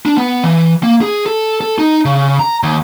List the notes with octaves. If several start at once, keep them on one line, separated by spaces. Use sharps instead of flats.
D4
B3
E3
A#3
G#4
A4
A4
D#4
C#3
A#5
D#2